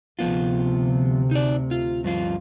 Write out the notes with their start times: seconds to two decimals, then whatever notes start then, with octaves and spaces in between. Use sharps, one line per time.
0.19 D2 C3 F3 B3 F4
1.31 D#4 D5
1.71 F4
2.04 G2 F3 F4